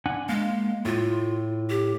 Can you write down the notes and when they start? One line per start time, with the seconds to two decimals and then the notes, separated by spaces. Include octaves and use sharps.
0.06 D4 F#5 G#5
0.29 G#3 A#3 F5
0.85 A2 F4
1.70 G4